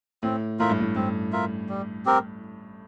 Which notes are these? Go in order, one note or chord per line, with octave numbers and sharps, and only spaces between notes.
A2 C4
A2 F4 A#4 E5
G2
A2
G2 C4
F4 A#4 E5
G3
C4 G4 A#4